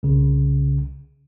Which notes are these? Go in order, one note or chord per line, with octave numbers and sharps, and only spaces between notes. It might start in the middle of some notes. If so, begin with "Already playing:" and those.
C2 C#3